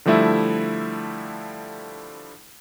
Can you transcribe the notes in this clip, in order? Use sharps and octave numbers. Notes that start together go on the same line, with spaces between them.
D3 F3 G3 A3 E4 E5